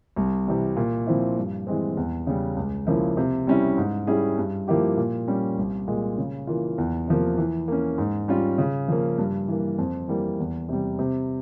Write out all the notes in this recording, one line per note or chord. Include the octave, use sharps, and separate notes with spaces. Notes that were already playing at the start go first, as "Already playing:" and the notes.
C2
C3 E3 G3
A#2
F3 C4 E4
G2
E3 G#3 C4
E2
C#3 G3
C#2
C#3 F3 A#3 E4
C3
G3 C#4 E4
G#2
G3 C#4 E4 G#4
G2
F3 A#3 E4 G4
A#2
G3 C#4
C2
A#2 G#3
C#3
E3 A#3 F4
E2
C3 F3 A#3
E3
A#3 C#4
G#2
G3 C#4 F4
C#3
F3 A#3
G2
E3 A#3
F2
E3 G3 A#3
E2
C3 G3
C3